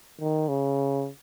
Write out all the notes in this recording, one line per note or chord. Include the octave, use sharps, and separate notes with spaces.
D#3
C#3